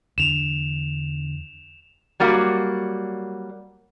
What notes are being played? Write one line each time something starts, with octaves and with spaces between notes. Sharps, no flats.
E2 D3 D4 E7 F7
F#3 G3 A#3 F#4